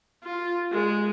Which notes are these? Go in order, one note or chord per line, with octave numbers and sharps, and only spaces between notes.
F4
G#3